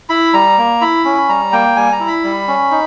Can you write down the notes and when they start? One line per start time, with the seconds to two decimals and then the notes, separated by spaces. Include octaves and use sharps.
0.10 E4 B5
0.34 G3 A#5
0.58 A#3
0.81 E4 B5
1.05 C#4
1.28 G3 A#5
1.52 A#3 G5
1.76 G3 G#5
1.92 A#5
2.00 E4
2.08 B5
2.24 G3
2.48 C#4
2.71 D#4